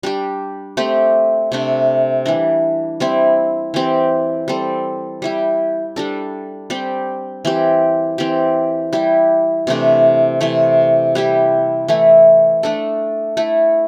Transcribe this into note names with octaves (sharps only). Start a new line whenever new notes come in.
G3 D4 G4
A3 C4 G4
C3 A3 D4
E3 G3 D4
G3 C4 E4
E3 C4 G4
G3 C4 A4
G3 E4 G4
G3 D4 A4
G3 C4 G4
E3 C4 G4
E3 C4 G4
G3 E4 G4
C3 E3 A3 D4
C3 E3 A3
G3 E4 G4
E3 A3 E4
A3 D4 A4
A3 E4 A4